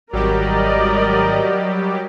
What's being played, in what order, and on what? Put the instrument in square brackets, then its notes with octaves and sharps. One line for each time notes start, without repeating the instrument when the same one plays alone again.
[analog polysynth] G#1 [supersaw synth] F#3 G3 G4 [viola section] A#4 D5 D#5